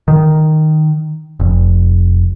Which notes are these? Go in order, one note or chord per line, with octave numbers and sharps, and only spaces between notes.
D#3
F1